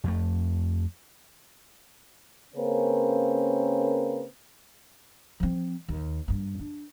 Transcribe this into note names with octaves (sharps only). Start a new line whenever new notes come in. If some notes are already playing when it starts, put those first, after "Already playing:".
F2 A3
C#3 A#3 C4 C#4 A#4 B4
F3 C4
D#2
G2 A#3
D4